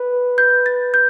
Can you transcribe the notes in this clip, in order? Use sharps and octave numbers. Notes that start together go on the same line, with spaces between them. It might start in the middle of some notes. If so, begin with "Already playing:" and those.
Already playing: B4
G6
A6
G6